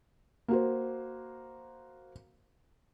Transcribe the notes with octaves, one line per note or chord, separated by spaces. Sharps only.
A#3 F#4 C5